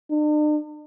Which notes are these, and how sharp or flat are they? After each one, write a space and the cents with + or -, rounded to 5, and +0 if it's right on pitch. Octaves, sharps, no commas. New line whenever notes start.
D4 +45